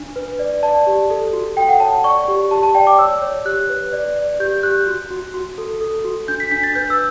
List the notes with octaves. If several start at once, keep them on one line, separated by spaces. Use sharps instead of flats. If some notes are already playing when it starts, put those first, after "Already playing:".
Already playing: D4
B4
D5
D5 A5
G4
A4
F#4
A4 G5
F#5
C#5 A5
D5 C#6
G4
G4 A5
A5
D5 G5
D6
C#5 E6
C#5
G4 F#6
B4
D5
D5
G4 G6
G6
G4 F#6
F#4
F#4
F#4
A4
A4
F#4
D4 G6
B6
D4 B6
A6
B4 G6
E6